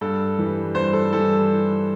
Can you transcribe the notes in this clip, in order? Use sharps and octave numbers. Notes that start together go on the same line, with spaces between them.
G2 A4
E3 G3
G2 C5
A4
E3 G3 A4